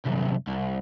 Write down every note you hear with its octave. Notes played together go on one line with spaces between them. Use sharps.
C2 F#2
C2